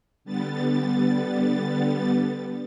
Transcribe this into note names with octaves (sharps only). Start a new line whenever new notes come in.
D3 G3 B3 A6